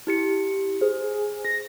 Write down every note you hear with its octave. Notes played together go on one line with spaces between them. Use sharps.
E4 G4 C#7
G#4 C5
A#6